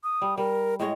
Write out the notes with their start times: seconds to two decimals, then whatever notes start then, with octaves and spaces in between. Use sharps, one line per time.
0.04 D#6
0.22 G3
0.38 G3 A#4
0.80 A2 G#3 C#5 D#5